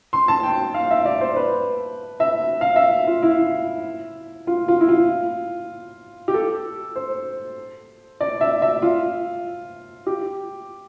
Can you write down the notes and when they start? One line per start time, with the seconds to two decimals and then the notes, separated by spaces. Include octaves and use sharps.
0.13 C6
0.28 A5
0.43 G5
0.74 F5
0.91 E5
1.05 D5
1.21 C5
1.36 B4
2.20 E5
2.61 F5
2.76 E5
3.07 F4
3.23 E4
4.47 F4
4.68 F4
4.81 E4
4.88 F4
6.28 G4
6.34 A4
6.96 C5
8.20 D5
8.41 E5
8.62 E5
8.82 F4
10.07 G4